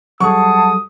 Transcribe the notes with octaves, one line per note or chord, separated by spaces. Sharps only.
F#3 G3 G#4 A4 F#5 A5 C#6 D#6